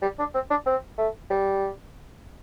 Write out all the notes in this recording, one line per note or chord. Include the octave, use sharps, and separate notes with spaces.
G3
D4
C4
D4
C4
A3
G3